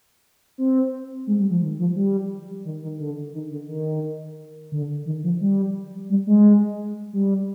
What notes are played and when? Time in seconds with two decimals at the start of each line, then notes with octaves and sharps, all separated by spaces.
0.58 C4
1.27 G#3
1.39 G3
1.50 F3
1.62 D#3
1.79 F3
1.96 G3
2.65 D#3
2.83 D#3
3.00 D3
3.34 D#3
3.51 D3
3.68 D#3
4.72 D3
5.06 D#3
5.24 F3
5.41 G3
6.10 G3
6.27 G#3
7.13 G3